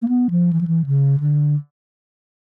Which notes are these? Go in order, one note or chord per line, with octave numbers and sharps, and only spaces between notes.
A#3
B3
F3
E3
F3
E3
C#3
D3